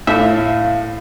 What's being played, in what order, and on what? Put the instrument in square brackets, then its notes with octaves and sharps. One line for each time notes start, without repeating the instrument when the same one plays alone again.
[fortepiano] A2 [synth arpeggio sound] E5 [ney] F5